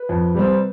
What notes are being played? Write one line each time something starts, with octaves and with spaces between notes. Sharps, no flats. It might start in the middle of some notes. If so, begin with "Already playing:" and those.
Already playing: B4
F2
C3 G3 C4